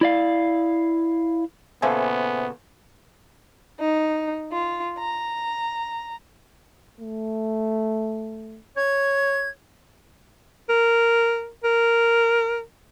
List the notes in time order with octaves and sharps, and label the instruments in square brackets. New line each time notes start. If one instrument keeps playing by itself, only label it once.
[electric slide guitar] E4 D5 F5
[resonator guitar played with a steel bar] A#2 C#3 A4 [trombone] B3 [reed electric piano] C5 E5 G#5
[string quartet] D#4
F4
A#5
[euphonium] A3
[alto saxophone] C#5 [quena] G#6
[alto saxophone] A#4
A#4